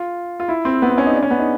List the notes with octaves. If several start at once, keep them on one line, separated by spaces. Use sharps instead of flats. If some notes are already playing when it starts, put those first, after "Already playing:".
Already playing: F4
F4
E4
C4
B3
C4
C#4
D#4
D4
C#4
B3
D#4